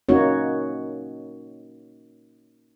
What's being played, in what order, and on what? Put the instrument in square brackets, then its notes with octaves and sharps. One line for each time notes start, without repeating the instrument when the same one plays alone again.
[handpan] A#3 C#4 D#4 F#4 C#5